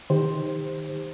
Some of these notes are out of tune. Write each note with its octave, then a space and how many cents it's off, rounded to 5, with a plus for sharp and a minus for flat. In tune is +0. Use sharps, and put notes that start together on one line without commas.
D#3 +0 G4 +25 C5 +5